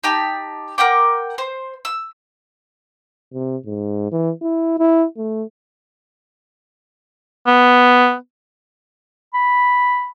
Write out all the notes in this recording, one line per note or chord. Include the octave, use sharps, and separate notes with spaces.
D#4 G4 A5
A#4 F#5 G5 D6
C5
E6
C3
G#2
E3
E4
E4
A3
B3
B5